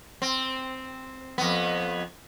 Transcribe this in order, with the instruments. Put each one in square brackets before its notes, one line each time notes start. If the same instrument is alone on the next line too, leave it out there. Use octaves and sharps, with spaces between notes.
[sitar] C4
F2 B3